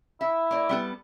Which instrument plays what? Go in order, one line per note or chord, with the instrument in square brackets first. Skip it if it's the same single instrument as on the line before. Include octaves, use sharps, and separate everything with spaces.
[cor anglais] E4 [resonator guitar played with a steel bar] E5
[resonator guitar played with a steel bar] A#3 D5
G3 B3 A4